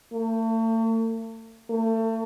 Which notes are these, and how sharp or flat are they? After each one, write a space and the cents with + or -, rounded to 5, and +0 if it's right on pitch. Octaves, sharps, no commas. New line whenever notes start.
A3 +40
A3 +35